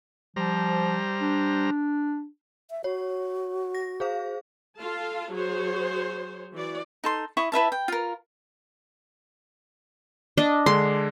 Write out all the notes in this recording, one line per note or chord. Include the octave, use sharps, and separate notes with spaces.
F3 G3 C5 A#5
D4
E5
F#4 C#5
A#6
G#4 C5 F5
F4 A4 F5 A5
F#3 F#4 G#4 C5 C#5
E3 F#4 D5
D#4 A4 C6
E4 E5 C#6 D#6
E4 B4 E5 A5
G5
F4 A#4
D4 D#5
D3 G#3 C6